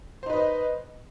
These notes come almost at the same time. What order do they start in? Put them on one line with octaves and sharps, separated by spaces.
C5 D#4 B4 D#5